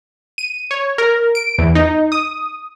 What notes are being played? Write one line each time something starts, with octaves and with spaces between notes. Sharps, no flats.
D#7
C#5
A#4
D7
E2
D#4
D#6